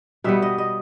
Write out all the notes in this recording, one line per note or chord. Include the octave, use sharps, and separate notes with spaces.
B2 G3 B3 E5
D#5
D#5